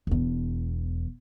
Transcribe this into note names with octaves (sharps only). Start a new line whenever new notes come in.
E1 E2